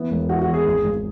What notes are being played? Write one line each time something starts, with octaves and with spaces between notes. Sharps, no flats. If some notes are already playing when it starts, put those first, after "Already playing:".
Already playing: E3 B3
E1
E3 F#4
F#4
E2
G#4
G#1
G#1